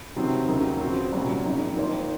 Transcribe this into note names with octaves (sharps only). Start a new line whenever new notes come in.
C3 D#3 F#3 C4
D#2 C#3 F#3 A#3 D#4
C#3 F3 C4 F#4
C2 A#2 F#3 C#4
G#1 F#2 F3 A#3 D#4
D#3 A#3 F4 C5